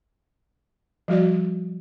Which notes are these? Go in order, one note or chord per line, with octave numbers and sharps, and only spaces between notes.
F3 G3 F#4 D5